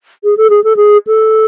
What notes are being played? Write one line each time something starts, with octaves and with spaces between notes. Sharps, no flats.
G#4
A4
G#4
A4
G#4
A4